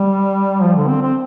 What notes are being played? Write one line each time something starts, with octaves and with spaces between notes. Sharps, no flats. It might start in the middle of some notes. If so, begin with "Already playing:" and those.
Already playing: G3
F3
D3
C4
C4